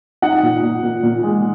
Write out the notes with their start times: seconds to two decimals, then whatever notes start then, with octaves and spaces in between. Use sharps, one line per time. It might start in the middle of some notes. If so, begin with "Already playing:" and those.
0.22 D#4 F#5
0.43 A#2
0.63 A#2
0.83 A#2
1.03 A#2
1.23 G#3